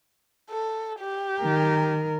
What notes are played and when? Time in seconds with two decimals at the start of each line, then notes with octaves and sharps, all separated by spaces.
0.50 A4
1.00 G4
1.41 D#3 A#4